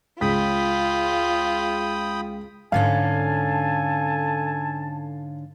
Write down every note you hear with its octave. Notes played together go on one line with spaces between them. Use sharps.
C#2 C#3 F4 G5 B5 D#6 B6
G#2 D3 C#4 A4 F5 G#5 A5